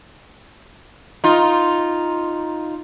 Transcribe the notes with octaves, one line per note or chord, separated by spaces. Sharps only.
D#4 F4